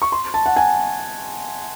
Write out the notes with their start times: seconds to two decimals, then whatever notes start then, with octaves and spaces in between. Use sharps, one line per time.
0.02 C#6
0.12 C6
0.34 A5
0.46 F#5
0.56 G#5